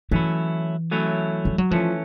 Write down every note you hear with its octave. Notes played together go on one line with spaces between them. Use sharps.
E3 F#3 A3 C#4 E4
F#3 A3 C#4 E4
G3
F#3
E3 F3 A3 C#4